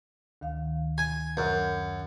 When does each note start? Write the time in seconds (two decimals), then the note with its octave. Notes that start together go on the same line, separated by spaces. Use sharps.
0.41 D2 D#3 F5
0.98 G#5
1.37 F#2